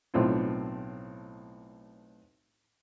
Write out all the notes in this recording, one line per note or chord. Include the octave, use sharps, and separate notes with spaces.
B1 A2 C4 F4